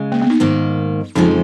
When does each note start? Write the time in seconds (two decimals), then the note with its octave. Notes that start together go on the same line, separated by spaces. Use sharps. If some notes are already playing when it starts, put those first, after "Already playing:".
Already playing: C#3 G#3
0.12 A#3
0.22 B3
0.30 D#4
0.40 G#2 D#3 A#3
1.15 F2 C#3 F3 G#3 D#4